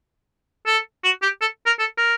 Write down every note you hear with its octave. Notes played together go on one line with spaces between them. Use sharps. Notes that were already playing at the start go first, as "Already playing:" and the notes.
A4
F#4
G4
A4
A#4
A4
A#4